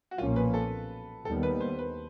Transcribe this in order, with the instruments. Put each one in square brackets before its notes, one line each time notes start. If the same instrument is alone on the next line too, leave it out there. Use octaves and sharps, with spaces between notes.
[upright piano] F#4
[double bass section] B1 A#2 F3 A#3 C#4 [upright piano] F4
[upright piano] B4
A4
[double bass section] D#2 D#3 G3 B3 [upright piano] A4
[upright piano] B4
C5
B4